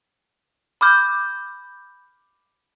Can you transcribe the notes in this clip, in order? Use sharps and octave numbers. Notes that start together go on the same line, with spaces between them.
B5 D6 F6 G6